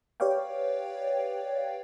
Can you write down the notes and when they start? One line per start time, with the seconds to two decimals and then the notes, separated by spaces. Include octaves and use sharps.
0.20 G4 B4 C#5 D5 F5 G5